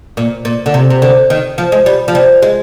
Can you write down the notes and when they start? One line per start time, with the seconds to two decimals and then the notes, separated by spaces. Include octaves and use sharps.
0.17 A#2
0.45 A#2
0.66 D3
0.74 C3
0.90 C3
1.02 D3
1.30 D#3
1.58 F3
1.72 G#3
1.86 G3
2.08 F3
2.15 G3
2.42 G#3